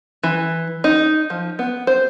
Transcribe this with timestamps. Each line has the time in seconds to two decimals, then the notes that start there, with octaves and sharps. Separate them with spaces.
0.23 E3
0.84 D#4
1.30 F3
1.59 B3
1.87 C5